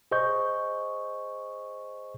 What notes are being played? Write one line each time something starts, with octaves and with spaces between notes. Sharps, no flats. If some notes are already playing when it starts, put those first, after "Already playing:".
G#4 C5 D#5 C#6 G6